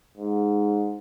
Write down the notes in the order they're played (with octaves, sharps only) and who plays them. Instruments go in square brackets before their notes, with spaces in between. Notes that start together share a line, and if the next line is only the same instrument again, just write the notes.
[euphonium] G#2